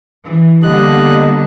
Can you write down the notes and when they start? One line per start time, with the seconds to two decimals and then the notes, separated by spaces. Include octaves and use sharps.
0.24 E3
0.63 D3 G3 A#3 B3 D#5 F#6